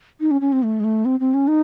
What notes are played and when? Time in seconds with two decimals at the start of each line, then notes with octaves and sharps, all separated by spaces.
0.20 D#4
0.31 C#4
0.41 C#4
0.52 C4
0.63 A3
0.80 G#3
0.84 A3
1.05 C4
1.20 C4
1.34 C#4
1.48 D#4